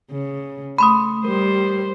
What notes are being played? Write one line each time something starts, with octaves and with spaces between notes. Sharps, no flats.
C#3
A3 B5 C6 D#6
G3 A#4 C5